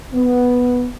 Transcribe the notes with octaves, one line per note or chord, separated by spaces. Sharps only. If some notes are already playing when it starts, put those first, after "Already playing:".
B3